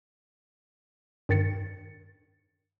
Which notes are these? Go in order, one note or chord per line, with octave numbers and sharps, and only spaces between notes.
G2 D#3 A6 C#7